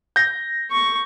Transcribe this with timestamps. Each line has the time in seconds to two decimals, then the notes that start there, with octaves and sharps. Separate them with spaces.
0.16 G6 A#6
0.71 C#6